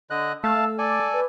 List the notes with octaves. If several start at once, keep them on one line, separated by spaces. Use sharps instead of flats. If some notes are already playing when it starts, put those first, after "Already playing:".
D3 D#5 F#6
A3 F5 A5 E6
A4 D5 G#5
D6
B4